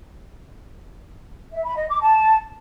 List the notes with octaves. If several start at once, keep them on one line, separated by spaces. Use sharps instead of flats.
E5
B5
D#5
D6
A5